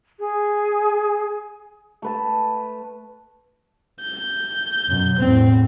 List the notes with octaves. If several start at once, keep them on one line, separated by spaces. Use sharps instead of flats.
G#4
A3 B4 A5
G6
F#2 B2
E2 A2 C4